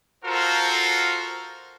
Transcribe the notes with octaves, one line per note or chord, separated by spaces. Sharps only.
F4 F#4 A4 A#4 C5